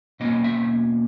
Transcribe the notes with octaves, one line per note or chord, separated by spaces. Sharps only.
B2 A#3 C#4 D#5
E5